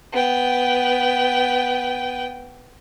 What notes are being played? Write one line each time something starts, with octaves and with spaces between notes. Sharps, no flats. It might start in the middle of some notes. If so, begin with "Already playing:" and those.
B3 G5